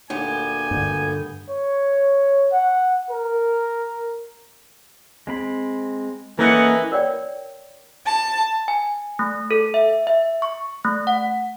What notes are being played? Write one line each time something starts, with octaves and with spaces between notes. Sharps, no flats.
D2 A#2 B3 G4 G#5 G6
G2 D3
C#5
F#5
A#4
G#3 C4 B5
E3 A#3 C#4 A4 A#4 D#5 F#5
A#4 C#5 D5 G5
A5
G#5
A3
A4
E5
E5
C#6
A3
F#5